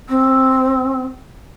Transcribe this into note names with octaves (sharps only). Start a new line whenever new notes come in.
C4